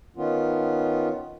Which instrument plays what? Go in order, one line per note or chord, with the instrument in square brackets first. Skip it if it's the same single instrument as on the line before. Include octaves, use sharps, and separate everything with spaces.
[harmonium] D#3 B3 C#4 F4